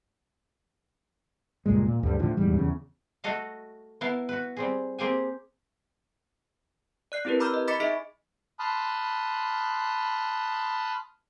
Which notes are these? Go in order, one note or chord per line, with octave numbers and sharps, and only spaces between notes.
C#2 G2 A#2 G#3
A#2
D2 G2 D3 G3
A2 D3 F3
D#1 E2 G#2 G3
E2 C#3
A3 F#4 A4 D#5 F5
B3 E4 A#4 F5 A5
F#4 B4
G3 C4 G#4
A#3 C4 G4 G#4 F5 G#5
D5 F#6 C7
C4 E4 G4 A#4 B4
A#5 B5 D6 E6 F6 G6
D#5
D#5 B5 D6 A6 B6 C#7
D#4 G#4 D#5 E5 B6 D7
A5 B5 C6 D#6 F6 F#6